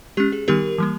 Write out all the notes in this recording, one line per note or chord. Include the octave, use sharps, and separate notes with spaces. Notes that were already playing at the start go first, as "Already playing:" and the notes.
G#3 C#4 G4
G#4
D#3 G3 B3 D#4 G4 A#4
E3 G3 A#3